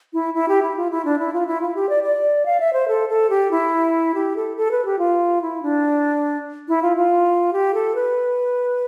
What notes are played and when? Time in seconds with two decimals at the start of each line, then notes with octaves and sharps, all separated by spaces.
0.13 E4
0.34 E4
0.49 G4
0.63 E4
0.77 F4
0.91 E4
1.05 D4
1.19 E4
1.33 F4
1.47 E4
1.61 F4
1.75 G4
1.89 D5
2.03 D5
2.46 F5
2.60 E5
2.73 C5
2.88 A4
3.09 A4
3.30 G4
3.51 E4
4.14 G4
4.36 A4
4.57 A4
4.71 B4
4.85 G4
4.99 F4
5.42 E4
5.62 D4
6.68 E4
6.82 F4
6.97 F4
7.53 G4
7.74 A4
7.95 B4